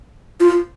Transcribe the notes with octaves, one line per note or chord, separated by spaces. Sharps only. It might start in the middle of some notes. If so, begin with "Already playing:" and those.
F4